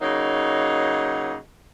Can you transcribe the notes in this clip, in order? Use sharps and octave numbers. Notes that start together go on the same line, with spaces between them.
C#3 F#3 A#3 D#4